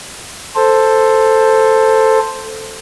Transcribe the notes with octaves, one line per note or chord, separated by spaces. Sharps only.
A4 C5